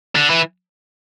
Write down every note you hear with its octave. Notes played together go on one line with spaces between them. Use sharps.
D3
E3